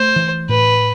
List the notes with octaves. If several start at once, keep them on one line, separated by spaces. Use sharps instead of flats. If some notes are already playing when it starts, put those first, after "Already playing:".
Already playing: A3 C5
E3
A2 B4